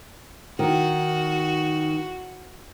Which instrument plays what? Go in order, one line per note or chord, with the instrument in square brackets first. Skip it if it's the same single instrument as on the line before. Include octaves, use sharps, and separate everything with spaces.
[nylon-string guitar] D#3 [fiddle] F#4